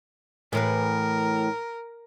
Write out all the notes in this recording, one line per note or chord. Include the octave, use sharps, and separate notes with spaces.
A2 E3 A#4 B4